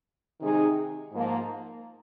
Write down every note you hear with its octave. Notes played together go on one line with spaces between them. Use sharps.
C3 D#3 G#3 D#4 G#4
G#2 F3 A#3